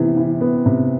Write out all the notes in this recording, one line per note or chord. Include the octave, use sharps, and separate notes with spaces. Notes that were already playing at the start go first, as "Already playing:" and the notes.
Already playing: C3 E3 B3
E3
B3
C3